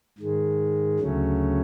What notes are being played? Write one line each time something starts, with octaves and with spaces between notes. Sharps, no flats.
G#2 D#3 G#3
D2 C#3 F#3 A3 C#4